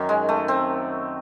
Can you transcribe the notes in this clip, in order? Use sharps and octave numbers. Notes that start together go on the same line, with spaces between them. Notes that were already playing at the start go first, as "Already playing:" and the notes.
Already playing: F#2 D#3 F#3
G#3
A3
C4